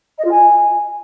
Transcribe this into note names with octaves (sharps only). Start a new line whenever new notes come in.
D#5
F4
G#5